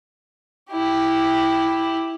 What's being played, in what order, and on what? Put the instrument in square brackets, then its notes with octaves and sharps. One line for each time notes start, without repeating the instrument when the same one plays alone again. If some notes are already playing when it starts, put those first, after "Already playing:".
[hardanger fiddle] E4 G4